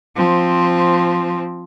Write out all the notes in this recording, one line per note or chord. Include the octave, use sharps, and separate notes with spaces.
F3 C4